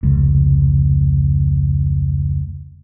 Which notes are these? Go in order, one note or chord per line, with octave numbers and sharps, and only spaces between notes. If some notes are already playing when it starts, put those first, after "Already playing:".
F1 C#2